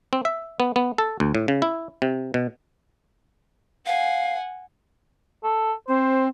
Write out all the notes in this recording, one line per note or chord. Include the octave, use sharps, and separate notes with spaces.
C4
E5
B3
B3
A4
D2
A2
C#3
E4
C3
B2
F5 F#5 G#5
A4
C4 C5